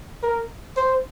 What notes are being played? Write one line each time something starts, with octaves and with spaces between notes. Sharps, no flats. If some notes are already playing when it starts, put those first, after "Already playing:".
A#4
C5